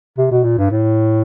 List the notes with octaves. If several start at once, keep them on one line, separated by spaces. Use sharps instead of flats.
C3
B2
A#2
G2
A2